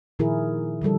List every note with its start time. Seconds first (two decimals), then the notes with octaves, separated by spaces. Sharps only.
0.19 A#2 D#3 F3 E4 G#4 A#4
0.82 D3 F3 G3 A4